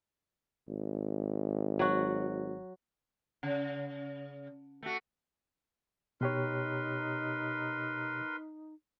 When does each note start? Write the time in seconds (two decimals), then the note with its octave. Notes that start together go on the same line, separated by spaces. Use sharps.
0.68 G#1
1.79 F#3 F#4
3.43 C#3
4.83 A3 F#4
6.21 B2 D#4 G4 A#4 B4 C#5 C6